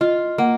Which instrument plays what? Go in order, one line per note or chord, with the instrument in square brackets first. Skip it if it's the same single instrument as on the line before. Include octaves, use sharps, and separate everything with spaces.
[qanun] F4 [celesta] D#5
[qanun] A#3 [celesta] F#5